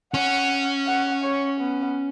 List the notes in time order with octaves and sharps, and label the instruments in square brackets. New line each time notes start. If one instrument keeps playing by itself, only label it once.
[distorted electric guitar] C#4 [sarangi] F#5
[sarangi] F#5
C#5
B3